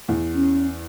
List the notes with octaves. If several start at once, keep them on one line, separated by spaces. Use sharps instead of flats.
E2
C#4